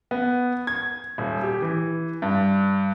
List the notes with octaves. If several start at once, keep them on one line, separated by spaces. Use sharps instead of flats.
B3
G#6
D#1
G4
E3
G2